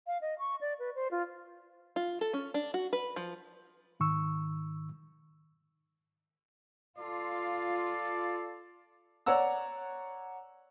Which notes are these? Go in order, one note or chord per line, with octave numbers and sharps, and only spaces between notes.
F5
D#5
C#6
D5
B4
C5
F4
F4
A4
C#4
D4
F#4
B4
F3
G#2 D#3 C#6 E6
F4 A4 D5
C#5 D5 F#5 A#5 E6